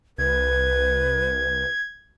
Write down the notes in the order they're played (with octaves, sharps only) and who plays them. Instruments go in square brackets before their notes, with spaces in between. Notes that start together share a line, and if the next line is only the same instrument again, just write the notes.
[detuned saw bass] C2 [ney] B4 [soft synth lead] G#6